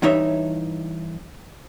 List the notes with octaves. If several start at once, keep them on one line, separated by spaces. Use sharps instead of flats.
G2 E3 D#4 C#5 E5